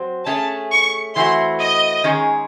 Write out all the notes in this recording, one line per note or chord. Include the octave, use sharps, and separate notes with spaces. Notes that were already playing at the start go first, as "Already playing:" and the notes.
Already playing: F#3 C4
A3 C#4 G#4 A5
C#6
E3 A3 C4 F#4 C6
D#5
D#3 G#3 C#4 G#4